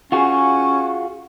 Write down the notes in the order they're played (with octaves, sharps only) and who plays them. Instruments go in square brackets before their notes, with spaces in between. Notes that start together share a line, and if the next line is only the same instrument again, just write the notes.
[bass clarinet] C#4 [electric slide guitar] F4 F#4 G#4